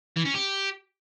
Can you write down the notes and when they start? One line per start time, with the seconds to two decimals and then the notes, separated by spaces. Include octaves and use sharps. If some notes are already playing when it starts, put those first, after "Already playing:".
0.16 E3
0.25 C#4
0.34 G4